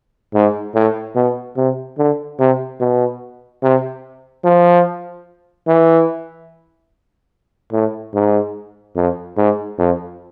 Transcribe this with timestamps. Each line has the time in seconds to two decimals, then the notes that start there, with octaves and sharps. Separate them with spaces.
0.34 G#2
0.74 A2
1.16 B2
1.57 C3
1.98 D3
2.39 C3
2.80 B2
3.63 C3
4.44 F3
5.67 E3
7.73 A2
8.14 G#2
8.96 F2
9.37 G#2
9.79 F2